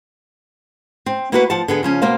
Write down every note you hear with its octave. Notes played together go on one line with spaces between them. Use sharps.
C4
A#3 B3 E4 F#4 A#4 B4
F3 F#5 A5
D3 B3 G#4
C#3 F3 C#4
B2 A#3 C5 F5